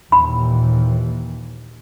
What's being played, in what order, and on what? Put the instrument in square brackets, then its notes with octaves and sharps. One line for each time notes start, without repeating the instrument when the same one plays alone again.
[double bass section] D#2 A#2 E3 [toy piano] B5